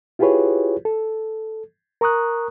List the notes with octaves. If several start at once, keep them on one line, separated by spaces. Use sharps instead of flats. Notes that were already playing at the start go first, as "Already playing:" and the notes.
E4 F4 G4 G#4 B4 C#5
A4
A#4 A#5 C#6 D#6 F#6